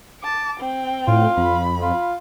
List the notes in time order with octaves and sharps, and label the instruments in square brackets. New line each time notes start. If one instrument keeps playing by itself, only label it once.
[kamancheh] A5 D6
C4 G5
[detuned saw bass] A2 [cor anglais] F4
[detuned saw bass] F2 [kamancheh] B5
[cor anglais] F4